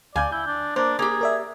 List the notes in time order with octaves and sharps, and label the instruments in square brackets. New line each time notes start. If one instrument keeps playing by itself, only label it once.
[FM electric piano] D2 F5 G6 [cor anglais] D5 [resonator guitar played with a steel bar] G#5
[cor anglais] E4 [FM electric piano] G6
[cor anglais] D4
[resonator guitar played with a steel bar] A#3 [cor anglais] D4 [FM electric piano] C5
[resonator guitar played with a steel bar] A#3 G4 [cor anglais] G#4
[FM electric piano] A#4 D5 E5